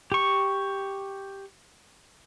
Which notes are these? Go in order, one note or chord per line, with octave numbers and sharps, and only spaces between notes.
G4 C#6